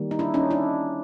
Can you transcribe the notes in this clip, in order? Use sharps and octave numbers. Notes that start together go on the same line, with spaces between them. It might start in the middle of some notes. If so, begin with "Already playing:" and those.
Already playing: D#3 G3 A#3
D#4
D4 E4
C#4 D#4
D4 E4